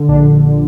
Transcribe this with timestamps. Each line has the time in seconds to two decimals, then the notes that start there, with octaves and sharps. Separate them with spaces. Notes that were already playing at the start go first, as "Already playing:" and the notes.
Already playing: D3
0.08 A#1 D4